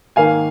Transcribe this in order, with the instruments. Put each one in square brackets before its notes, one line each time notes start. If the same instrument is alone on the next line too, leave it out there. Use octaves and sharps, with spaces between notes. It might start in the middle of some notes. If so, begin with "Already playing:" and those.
[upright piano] G#2 D#3 A#3 F5 G#5